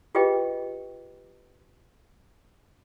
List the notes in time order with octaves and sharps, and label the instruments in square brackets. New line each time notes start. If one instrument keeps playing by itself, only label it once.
[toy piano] F4 G4 G#4 B4 D#5 G5